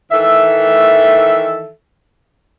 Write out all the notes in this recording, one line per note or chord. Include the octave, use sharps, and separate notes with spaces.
D#3 E3 A4 E5